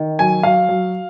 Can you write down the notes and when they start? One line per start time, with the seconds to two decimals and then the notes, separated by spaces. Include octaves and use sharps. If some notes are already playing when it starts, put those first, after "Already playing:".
Already playing: D#3
0.19 F#3 G#5
0.43 F#3 F5
0.69 F#3